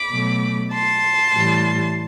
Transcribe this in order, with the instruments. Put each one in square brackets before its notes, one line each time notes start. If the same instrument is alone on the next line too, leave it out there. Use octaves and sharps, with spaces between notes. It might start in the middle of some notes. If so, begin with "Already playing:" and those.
Already playing: [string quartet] B5 D6
B2 F#3 A3
A5 C6
A2 E3 G3